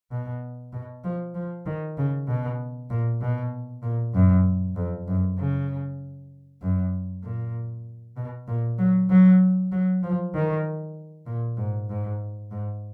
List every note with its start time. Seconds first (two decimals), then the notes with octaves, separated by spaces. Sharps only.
0.11 B2
0.73 B2
1.04 F3
1.35 F3
1.66 D#3
1.98 C#3
2.28 B2
2.90 A#2
3.21 B2
3.83 A#2
4.14 F#2
4.76 F2
5.08 F#2
5.38 C#3
6.62 F#2
7.24 A#2
8.17 B2
8.48 A#2
8.78 F#3
9.10 F#3
9.72 F#3
10.03 F3
10.34 D#3
11.26 A#2
11.57 G#2
11.89 G#2
12.51 G#2